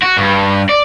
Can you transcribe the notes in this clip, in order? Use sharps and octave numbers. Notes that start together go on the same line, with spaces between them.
F#4
G2
D5